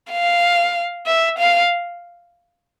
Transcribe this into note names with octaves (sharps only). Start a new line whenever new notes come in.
F5
E5
F5